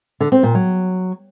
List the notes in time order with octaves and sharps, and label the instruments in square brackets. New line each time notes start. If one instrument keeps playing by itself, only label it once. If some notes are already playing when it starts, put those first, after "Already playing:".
[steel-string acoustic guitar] D3
C4
A#2
F#3